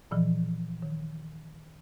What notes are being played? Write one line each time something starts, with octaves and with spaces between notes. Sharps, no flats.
A#2 E3 F3
D#3